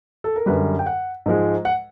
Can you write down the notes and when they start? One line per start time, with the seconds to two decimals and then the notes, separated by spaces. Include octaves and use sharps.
0.24 A4
0.36 A#4
0.46 F#2 D3 G3 B4
0.79 G5
0.86 F#5
1.26 G#2 F3 G#3
1.65 F#5